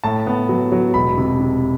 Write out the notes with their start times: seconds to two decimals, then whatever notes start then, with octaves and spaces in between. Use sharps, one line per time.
0.03 A2 A5
0.27 B3
0.49 F#3
0.72 F#3
0.94 E1 B5
1.18 C3
1.40 C3